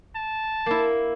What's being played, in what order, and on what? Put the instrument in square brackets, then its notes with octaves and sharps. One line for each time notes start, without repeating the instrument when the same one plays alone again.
[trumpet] A5
[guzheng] A#3 E4